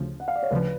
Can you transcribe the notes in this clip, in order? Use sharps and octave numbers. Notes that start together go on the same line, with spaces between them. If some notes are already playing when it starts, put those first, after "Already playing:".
Already playing: D2 C#3 F3
F#5
F5
D5
C#5
D2 C#3 F3 B4